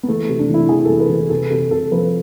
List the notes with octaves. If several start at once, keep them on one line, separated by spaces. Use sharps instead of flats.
B3
E3 A3
C3
D4
E3 E4
E3 G#4
E3 A4
B4
E3
B4
C3 A4
C3 A4
C3 A4
F3 B4